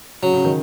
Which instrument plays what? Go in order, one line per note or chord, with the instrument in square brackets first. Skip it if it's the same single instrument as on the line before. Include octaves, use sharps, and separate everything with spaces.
[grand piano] C#3 [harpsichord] F#3
[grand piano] C#3
D#3